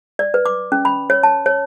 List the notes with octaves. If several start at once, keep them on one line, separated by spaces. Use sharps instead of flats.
D5
B4
D6
C#4
B5
C#5
A5
C#5